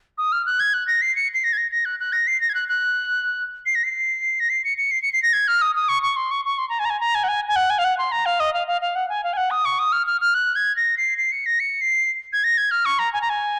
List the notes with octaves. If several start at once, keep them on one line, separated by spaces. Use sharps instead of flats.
D#6
F6
F#6
G#6
F#6
A#6
C7
C#7
C7
A#6
G#6
A#6
A#6
F#6
F#6
A#6
C7
A#6
G#6
F#6
F#6
C7
A#6
C7
A#6
C7
C#7
C#7
C7
C#7
C7
A#6
G#6
F6
D#6
D#6
C#6
C#6
C6
C#6
C#6
C6
A#5
G#5
A#5
G#5
A#5
G#5
F#5
G#5
G#5
F#5
G#5
F5
F#5
C6
A#5
F5
D#5
F5
F5
F5
F#5
G#5
F5
G#5
F#5
D#6
C#6
D#6
F6
F6
F6
F#6
G#6
A#6
C7
C7
C#7
A#6
C#7
C7
G#6
A#6
G#6
F6
C#6
A#5
G#5
A#5
G#5